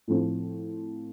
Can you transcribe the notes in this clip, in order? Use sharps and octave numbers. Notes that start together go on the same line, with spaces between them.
A2 F3 C4